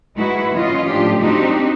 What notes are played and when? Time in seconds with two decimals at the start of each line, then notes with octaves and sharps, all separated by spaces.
0.16 G#3 D#4 E4 F#4 B4
0.54 E3 C#4 F4 D#5
0.87 A2 F3 D4 F4 G4
1.20 C4 D4 D#4 F#4 G4